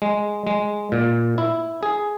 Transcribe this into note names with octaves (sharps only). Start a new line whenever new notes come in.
G#3
G#3
A#2
E4
G#4